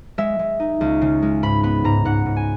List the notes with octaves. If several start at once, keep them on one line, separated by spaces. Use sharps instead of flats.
G#3 E5
G#3
D#4
C#2
C#3
G#3
G#2 B5
B3 B5
G#2 A#5
G#2 F#5
G#2
G#5